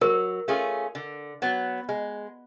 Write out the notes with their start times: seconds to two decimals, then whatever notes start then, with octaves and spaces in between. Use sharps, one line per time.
0.01 F#3 A#4
0.48 A3 C#4 F4 G#4
0.95 D3
1.42 F#3 B3
1.89 G#3